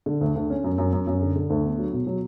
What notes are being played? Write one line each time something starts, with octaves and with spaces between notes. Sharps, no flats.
D3
D2
D2
C#4
F#2
F#2
F#2
F#2
D3
D3
D2
B3
F#3
B2
F#3